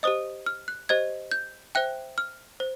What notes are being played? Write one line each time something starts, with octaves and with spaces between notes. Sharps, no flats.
G4 C5 D#5 D#6
F6
F#6
G4 C5 D#5 G#6
G6
C5 E5 G5 F#6
F6
C5